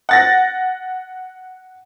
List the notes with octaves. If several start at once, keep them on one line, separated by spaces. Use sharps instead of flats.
F#5 A6 A#6